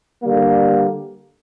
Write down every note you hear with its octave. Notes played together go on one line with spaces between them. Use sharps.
D3 G3 A#3